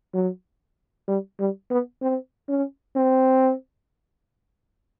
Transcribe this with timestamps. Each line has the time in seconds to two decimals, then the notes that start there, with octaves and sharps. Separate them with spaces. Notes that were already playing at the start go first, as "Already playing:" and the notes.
0.14 F#3
1.08 G3
1.39 G3
1.70 B3
2.02 C4
2.49 C#4
2.96 C4